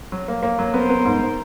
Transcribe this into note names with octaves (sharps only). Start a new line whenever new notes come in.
F#3
A#3
A#3
F#3
B3 A#4 C5
B3
G#2